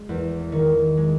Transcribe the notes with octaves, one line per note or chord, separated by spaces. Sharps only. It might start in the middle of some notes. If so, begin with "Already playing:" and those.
Already playing: G#3
E2
D#3
G#3